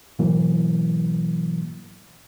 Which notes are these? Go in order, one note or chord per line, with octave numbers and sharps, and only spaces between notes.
G#2 B2 E3 F#3 A#3